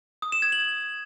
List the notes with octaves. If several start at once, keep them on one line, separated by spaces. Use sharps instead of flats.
D#6
E7
G#6
F#7